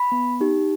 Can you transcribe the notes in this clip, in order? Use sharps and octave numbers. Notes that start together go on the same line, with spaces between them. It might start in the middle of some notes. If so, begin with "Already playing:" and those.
Already playing: B5
B3
D#4 G4